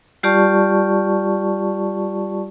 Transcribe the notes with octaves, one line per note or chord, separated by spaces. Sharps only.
G3 F4 G4 D5 A5 C#6